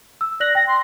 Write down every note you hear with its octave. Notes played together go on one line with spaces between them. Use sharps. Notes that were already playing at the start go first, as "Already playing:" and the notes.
E6
D5 F#6 A#6 F#7
G5 A#6
C6